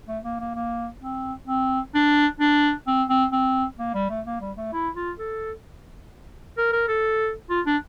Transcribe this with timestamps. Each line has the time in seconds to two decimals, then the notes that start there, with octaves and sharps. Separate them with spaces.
0.08 A3
0.24 A#3
0.40 A#3
0.55 A#3
1.01 C4
1.48 C4
1.94 D4
2.40 D4
2.87 C4
3.09 C4
3.32 C4
3.79 A#3
3.94 G3
4.10 A3
4.26 A#3
4.41 G3
4.57 A3
4.73 E4
4.95 F4
5.19 A4
6.57 A#4
6.73 A#4
6.88 A4
7.50 F4
7.66 D4